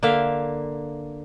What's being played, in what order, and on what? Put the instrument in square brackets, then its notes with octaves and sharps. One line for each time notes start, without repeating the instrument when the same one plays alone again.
[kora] D3 A#3 E5 F5